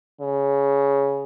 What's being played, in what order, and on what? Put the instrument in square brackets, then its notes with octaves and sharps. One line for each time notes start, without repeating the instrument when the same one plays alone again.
[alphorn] C#3